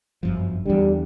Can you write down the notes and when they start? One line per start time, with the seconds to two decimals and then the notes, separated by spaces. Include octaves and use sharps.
0.23 G1 F#2 F3
0.66 E2 D3 G3